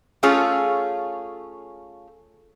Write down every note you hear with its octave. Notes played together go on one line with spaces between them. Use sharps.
A3 C#4 F4 G#4 A4 C#5